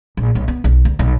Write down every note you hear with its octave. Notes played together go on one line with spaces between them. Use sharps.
A#1
B1
B3
B1
D2
B1